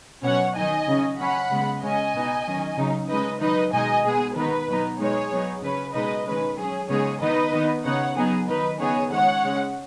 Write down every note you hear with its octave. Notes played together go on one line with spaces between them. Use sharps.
B2 F#3 C#4 C#5 F#5
D#3 F#3 D#4 D#5 G#5
C#3 F#3 C#4
F#3 C#4 F#5 B5
C#3 G#3 B3
C#3 G#3 C#4 D#5 G#5
B2 B3 D#4
D#3 F#3 C#4
C#3 F#3 D#4
C#3 G#3 D#4 B4 D#5
D#3 F#3 D#4 B4 D#5
B2 G#3 D#4 D#5 G#5
B2 G#3 B3 G#4
D#3 B3 D#4 B4
B2 F#3 B3 D#4
B2 G#3 D#4 G#4 C#5
F#3 B3 D#4
C#3 F#3 C#4 B4
B2 G#3 D#4 B4 D#5
D#3 G#3 C#4 B4
F#3 C#4 G#4
C#3 G#3 B3 D#4 G#4 C#5
D#3 B3 D#4 B4 D#5
D#3 B3 D#4
C#3 B3 D#4 C#5 F#5
F#3 B3 D#4 G#4
D#3 F#3 D#4 B4
C#3 B3 D#4 G#4 C#5
D#3 G#3 C#4 C#5 F#5
C#3 G#3 C#4